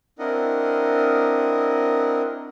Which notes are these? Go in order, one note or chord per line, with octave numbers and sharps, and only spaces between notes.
C4 D4 E4 A#4 D#5 F#5